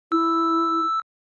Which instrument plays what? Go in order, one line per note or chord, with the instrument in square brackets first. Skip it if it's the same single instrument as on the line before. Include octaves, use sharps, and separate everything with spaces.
[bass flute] E4 [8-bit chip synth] E6